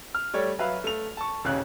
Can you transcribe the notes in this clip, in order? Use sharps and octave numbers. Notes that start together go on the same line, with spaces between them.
F6
G3 A3 C#5 D5
F#3 B4 E5 F5
A3 F7
A5 C#6
D#1 A1 C#3 C#4 F5 F#6